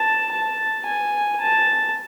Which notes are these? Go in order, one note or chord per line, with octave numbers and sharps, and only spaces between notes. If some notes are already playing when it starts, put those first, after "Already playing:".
Already playing: A5
A5
G#5
A5